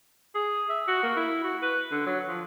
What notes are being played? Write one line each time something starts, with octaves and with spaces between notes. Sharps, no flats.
G#4
E5
F#4
A#3
E4
F#4
B4
D3
F#3
F3